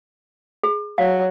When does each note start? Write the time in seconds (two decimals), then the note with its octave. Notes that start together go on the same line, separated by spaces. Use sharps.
0.63 G#4
0.98 F#3 F5